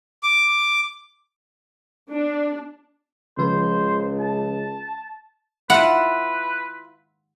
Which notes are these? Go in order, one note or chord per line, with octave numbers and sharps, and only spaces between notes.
D6
D4
C#2 C#3 F3 B4 C5
A5
E4 F4 B4 F#5 A5